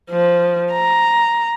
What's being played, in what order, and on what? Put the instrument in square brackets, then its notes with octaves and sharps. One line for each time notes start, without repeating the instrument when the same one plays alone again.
[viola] F3
A#5